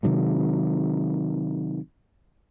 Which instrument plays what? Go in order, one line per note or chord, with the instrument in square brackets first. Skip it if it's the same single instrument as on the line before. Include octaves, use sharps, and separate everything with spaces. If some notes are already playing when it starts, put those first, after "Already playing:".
[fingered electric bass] C3 D#3 F#3 G#3